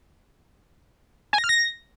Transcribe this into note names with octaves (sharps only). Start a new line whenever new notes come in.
G#5
A#6
F6
A#6